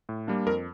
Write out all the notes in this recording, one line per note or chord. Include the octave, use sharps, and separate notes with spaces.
A2
G3 A#3 D4
F2 A#4